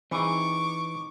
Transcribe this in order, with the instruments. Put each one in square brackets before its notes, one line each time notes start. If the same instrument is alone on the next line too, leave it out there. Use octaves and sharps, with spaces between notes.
[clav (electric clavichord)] E3 [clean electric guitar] C4 D#4 G#4 [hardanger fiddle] C#6 D6